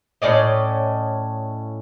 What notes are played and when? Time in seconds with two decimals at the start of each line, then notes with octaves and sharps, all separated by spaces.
0.22 A2 C#4 D5 D#5